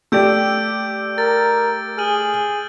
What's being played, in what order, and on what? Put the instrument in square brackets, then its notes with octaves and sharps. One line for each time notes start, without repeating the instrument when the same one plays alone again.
[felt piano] A3 G4 D5 [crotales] E6 G6 D7
[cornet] A#4 [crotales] A6
[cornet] G#4 [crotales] F6 D#7 F#7